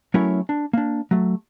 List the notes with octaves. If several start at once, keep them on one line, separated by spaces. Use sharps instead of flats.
F#3 A3 C#4 E4 A#4 C#5
D4
A#3 D4
F#3 A3